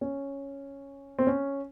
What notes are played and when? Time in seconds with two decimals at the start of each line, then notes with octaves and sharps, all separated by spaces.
0.01 C#4
1.19 C4
1.27 C#4